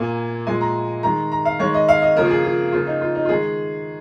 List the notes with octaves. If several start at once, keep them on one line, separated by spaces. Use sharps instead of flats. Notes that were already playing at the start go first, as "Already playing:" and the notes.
Already playing: A#2 A#3 G#5
A#2 F3 G#3 G#5
A#5
D#3 G#3 A#5
A#5
F5
D#3 G#3 C#5
D#5
F5
D#5
C#3 F3 A#3 A#4
F4
G#4
F4
C#3 F3 A#3 F4
D#4
F4
D#4
F4
D#3 G#3 G#4